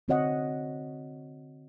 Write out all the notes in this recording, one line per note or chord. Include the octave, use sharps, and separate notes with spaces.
D3 C4 F#4 C#5 D#5 F#5